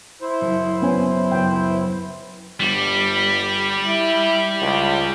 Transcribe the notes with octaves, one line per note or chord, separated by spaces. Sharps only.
E4 C5
F#1 C#7
B3 C#4 G#5
C#2 F#2 B3 G5
G1 G3
E4
C#2